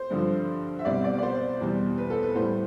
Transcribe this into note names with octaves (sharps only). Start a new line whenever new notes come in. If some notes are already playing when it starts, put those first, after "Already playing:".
Already playing: C5
G2 D3 F3
E5
C2 B2 G3 D5
D5
D5
C5
E2 B2 G3
B4
A4
B4
A2 G3 C5